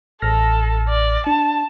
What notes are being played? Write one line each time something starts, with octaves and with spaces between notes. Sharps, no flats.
A1 A4 F6 A#6
D5
D4 A5